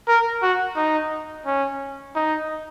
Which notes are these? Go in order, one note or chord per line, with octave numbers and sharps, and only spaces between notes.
A#4
F#4
D#4
C#4
D#4